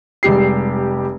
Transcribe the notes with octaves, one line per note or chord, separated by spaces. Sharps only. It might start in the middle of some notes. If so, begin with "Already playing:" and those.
F1 G3 G#3 G4 C7